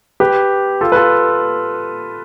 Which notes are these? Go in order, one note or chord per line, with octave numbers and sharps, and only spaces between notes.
G4 B4
F4 A4
B4
F4 A4